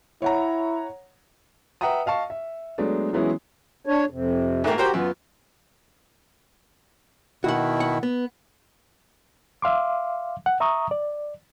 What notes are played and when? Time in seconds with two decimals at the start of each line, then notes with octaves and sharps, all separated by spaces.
0.22 E4 C#5 F#5 A#5
1.81 B4 E5 F#5 G5 A#5 D#6
2.06 D#5 F5 A5 C#6
2.30 E5
2.78 F#3 G#3 A3 B3 D4
3.13 E3 F#3 G#3 B3 C#4 E4
3.86 D4 C#5
4.10 F2 C3
4.64 G#2 A3 A#3 G4
4.78 F#4 G4 A#4 C5 G5
4.93 F#2 B3 F4
7.44 B2 D#3 E4 F#4 F#5
7.80 F#5
8.03 B3
9.62 E5 F5 C6 D6
10.46 F#5
10.60 E5 A#5 C#6 D#6
10.91 D5